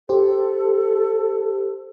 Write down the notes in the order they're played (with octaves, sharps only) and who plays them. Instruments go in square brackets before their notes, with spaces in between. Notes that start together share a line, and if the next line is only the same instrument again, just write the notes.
[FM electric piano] G4 C5 [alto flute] A4